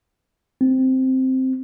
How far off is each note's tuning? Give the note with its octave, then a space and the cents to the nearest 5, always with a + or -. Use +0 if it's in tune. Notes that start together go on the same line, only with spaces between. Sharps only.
C4 +0